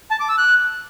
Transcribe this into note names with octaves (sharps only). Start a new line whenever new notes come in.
A5
D6
E6
F#6